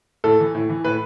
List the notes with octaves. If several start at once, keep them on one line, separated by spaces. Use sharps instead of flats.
A2 A4
E3
A2
E3
A2 B4